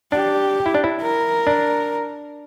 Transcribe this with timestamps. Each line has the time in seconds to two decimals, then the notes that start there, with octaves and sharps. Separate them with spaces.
0.12 D4 G4
0.66 E4
0.74 D4
0.84 E4
1.01 A#4
1.47 D4